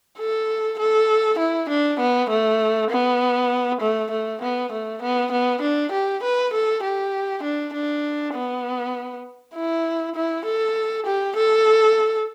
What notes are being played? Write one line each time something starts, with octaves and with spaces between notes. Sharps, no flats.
A4
A4
E4
D4
B3
A3
B3
A3
A3
B3
A3
B3
B3
D4
G4
B4
A4
G4
D4
D4
B3
E4
E4
A4
G4
A4